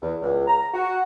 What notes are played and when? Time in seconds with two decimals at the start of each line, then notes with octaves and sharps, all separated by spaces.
0.02 E2
0.22 C#2
0.48 A#5
0.74 F#4